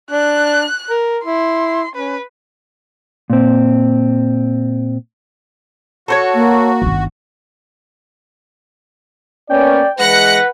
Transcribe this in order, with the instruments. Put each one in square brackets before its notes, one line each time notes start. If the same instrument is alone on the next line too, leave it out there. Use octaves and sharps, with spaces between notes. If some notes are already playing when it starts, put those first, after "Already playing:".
[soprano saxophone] D4 [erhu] F#6
[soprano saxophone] A#4
[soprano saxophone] E4 [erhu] C6
[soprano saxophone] C#4 [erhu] B4
[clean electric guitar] A#2 C4
[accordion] F#4 [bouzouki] A4 C5 C#5
[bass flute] A#3
[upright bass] G1 D#3
[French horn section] A#3 B3 C#4 [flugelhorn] D5 [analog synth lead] G5
[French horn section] E3 G#3 [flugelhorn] B4 [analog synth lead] F#5 [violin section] F#6 A#6 C#7